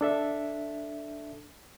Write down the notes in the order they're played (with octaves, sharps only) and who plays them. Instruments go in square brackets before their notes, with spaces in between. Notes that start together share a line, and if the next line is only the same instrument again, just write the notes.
[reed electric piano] D4 A4 E5